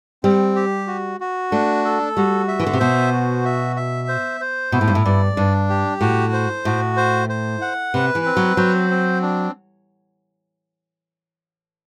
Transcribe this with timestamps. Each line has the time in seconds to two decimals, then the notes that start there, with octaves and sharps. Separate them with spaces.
0.23 G3 C4
0.56 G4
0.87 F#4
1.20 F#4
1.51 A3 D4
1.85 A4
2.17 G3 F#4
2.48 E5
2.60 E3
2.67 D3
2.73 C3
2.80 B2 C5
3.13 F#4
3.45 E5
3.76 E5
4.08 C5
4.41 C5
4.72 B2 E4
4.81 A2
4.88 G2
4.95 A2
5.05 G2 D5
5.36 G2 D4
5.69 G4
6.01 A2 F#4
6.33 C5
6.65 A2 F#4
6.97 C5
7.29 C5
7.61 F#5
7.94 C3 B4
8.15 E3
8.25 C4
8.37 F#3
8.57 F#3 C5
8.91 C4
9.22 D4